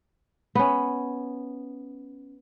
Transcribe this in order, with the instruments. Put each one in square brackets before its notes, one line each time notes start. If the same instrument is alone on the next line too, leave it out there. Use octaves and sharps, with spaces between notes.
[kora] B3 C#4